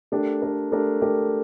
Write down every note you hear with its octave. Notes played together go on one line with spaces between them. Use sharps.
A3 D4 G4 A#4
A3 D4 G4 A#4
A3 D4 G4 A#4
A3 D4 G4 A#4